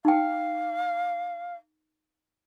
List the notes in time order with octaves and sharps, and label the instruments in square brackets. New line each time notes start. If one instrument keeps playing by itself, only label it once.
[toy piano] D#4 G5 [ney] F5